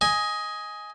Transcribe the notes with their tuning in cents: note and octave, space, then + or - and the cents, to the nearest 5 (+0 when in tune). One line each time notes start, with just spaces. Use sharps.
D#5 +15 G#5 +0